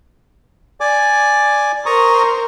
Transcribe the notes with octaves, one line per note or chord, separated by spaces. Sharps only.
D5 G#5 D6
A#4 C5 A#5 C#6 D#6